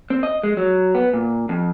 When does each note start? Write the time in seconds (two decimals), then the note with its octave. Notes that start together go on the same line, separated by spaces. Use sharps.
0.10 C4
0.23 D#5
0.43 G#3
0.57 F#3
0.95 B3
1.13 A#2
1.49 F2